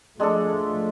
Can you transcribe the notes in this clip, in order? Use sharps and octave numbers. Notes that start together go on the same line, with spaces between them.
F3 G#3 A3 D4 A4